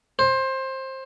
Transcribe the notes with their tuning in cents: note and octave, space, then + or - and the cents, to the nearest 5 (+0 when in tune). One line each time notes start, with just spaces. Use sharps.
C5 +20